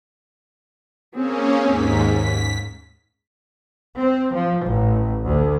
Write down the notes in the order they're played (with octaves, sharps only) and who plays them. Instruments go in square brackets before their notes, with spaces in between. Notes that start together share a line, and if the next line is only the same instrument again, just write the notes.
[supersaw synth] A#3 C#4 [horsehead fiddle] C4 G#4
[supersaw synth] D#2 G#2 B6
B6
[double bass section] C4
F3
A1
D2